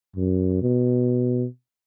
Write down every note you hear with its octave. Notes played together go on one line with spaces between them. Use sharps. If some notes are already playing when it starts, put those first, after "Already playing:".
F#2
B2